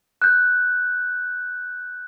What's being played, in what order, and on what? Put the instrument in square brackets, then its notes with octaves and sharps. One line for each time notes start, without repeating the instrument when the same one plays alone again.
[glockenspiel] F#6 G6